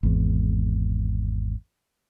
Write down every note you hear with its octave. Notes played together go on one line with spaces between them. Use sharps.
G#1 E2